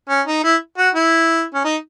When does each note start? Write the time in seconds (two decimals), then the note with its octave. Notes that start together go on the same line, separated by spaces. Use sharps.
0.09 C#4
0.27 D#4
0.44 E4
0.78 F#4
0.95 E4
1.54 C#4
1.64 D#4